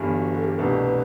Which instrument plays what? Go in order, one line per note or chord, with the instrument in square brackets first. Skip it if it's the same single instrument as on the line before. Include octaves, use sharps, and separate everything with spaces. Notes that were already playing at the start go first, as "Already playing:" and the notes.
Already playing: [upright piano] G1 G2 E3 G3
[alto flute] F#4
A4
G4
A4
[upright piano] C2 B2 A3 D4 G4 [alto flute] B4